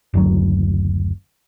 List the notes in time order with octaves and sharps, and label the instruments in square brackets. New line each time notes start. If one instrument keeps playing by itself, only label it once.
[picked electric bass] F#1 D2 F#3